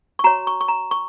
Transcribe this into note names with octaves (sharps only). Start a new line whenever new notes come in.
C#6
F#4 C#5 A#5
C#6
C#6
A#5
C#6